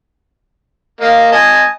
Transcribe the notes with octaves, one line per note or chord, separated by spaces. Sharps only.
A#3 D#5 F5
D#5 G#5 A5